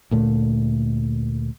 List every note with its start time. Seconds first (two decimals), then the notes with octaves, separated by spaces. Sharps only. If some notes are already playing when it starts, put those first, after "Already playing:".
0.11 D2 A#2 A3